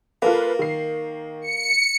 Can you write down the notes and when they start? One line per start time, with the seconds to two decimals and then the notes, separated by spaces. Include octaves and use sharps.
0.22 A#3 F4 A4 B4
0.59 D#3 C7
1.42 C#7